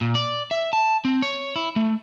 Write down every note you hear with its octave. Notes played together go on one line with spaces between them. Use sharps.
A#2
D5
E5
A5
C4
C#5
E4
A3